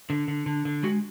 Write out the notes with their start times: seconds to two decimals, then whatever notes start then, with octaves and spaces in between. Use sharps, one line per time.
0.10 D3
0.28 D3
0.46 D3
0.65 D3
0.83 G#3 F#4